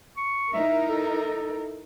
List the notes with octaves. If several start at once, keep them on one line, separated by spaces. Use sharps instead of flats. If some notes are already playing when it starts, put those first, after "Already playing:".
C#6
D#4 E4 A#4 E5
A4